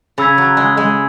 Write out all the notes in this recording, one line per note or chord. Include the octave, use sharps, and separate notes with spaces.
C#3 B5 E6 G#6 B6
F#3
G#3
G#3